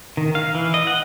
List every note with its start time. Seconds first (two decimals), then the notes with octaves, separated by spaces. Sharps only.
0.17 D#3
0.35 F5
0.55 E3
0.74 D#5
0.87 F#5